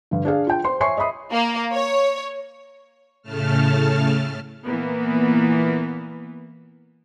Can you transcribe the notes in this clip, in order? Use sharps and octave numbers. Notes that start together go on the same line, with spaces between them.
G2 D3
D4 G#4 F5
F4 G5
C5 C6
C#5 E5 G#5 C6 C#6 C7
D#5 E5 B5 D#6
A#3
C#5
A2 C#3 A3 A5 F6
A#2 E3 A#3 B3